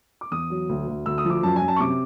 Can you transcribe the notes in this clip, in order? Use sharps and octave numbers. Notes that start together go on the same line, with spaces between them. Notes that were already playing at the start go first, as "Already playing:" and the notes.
D6
E2 D#6
F#3
D2
D2
D2 E6
D#6
F3
D6
F#2 A5
G#5
F#2
A5
C#6
C3 D6